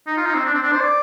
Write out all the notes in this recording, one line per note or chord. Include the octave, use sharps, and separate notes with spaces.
D#4
F4
D#4
C4
D4
C4
D4
C5
D5